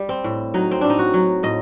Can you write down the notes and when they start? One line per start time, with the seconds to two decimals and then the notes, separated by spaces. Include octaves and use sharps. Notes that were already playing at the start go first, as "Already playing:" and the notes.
Already playing: G3
0.09 C4
0.24 A2
0.54 F#3 D#4
0.71 C4
0.81 A2 D4
0.90 D#4
0.99 F#4
1.14 F#3
1.43 A2 D#5